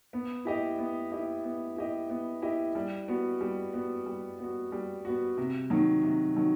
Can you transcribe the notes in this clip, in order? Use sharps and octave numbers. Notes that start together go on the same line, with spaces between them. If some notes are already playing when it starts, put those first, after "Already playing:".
B3
E4 G4 D#5
B3
E4 G4 D#5
B3
E4 G4 D#5
B3
E4 G4 D#5
G3
B3 F#4
G3
B3 F#4
G3
B3 F#4
G3
B3 F#4
C3
D#3 F#3
C3
D#3 F#3